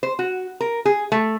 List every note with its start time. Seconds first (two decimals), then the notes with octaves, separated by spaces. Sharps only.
0.03 C5
0.19 F#4
0.61 A#4
0.85 G#4
1.12 A3